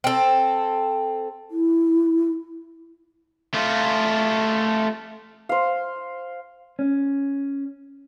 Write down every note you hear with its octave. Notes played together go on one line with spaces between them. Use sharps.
C4 A4
E4
A3 F4
C5 F5
C#4